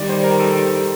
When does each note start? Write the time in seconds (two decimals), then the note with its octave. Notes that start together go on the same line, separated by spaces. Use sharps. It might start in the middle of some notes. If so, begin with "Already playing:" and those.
Already playing: D#3 G3 D5
0.09 C5
0.24 A#4
0.40 A4